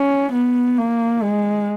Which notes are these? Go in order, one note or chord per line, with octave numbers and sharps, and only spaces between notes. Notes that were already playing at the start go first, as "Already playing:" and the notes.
Already playing: C#4
B3
A#3
G#3